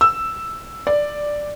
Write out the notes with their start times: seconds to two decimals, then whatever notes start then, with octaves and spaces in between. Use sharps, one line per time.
0.01 E6
0.87 D5